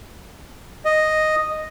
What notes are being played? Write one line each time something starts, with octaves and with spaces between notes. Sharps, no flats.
D#5